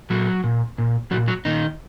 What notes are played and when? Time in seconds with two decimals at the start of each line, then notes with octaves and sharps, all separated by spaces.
0.10 A#2 F#3 F#4
0.44 A#2
0.78 A#2
1.11 A#2 F#3 F#4
1.28 F#3 F#4
1.45 A#2 D#3 D#4